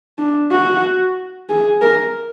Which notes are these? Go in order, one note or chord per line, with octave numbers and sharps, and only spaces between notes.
D4
F#4
G#4
A#4